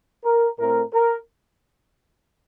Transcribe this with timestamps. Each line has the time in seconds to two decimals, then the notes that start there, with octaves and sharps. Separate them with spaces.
0.25 A#4
0.59 A2 A3 C4 A#4
0.93 A#4